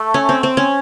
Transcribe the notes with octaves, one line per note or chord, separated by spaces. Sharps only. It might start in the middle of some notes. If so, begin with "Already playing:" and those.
Already playing: A3
C#4
C4
C4
C#4